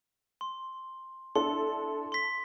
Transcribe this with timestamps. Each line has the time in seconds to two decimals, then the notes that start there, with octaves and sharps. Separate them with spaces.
0.41 C6
1.35 D4 E4 A4 C6
2.12 C6 B6